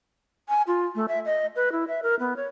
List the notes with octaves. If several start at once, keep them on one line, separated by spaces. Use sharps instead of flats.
G#5
F4
A3
E5
D#5
B4
E4
E5
A#4
B3
C#5